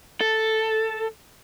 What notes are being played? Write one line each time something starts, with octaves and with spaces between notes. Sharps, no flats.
A4